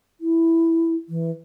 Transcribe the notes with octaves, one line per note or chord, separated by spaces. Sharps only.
E4
E3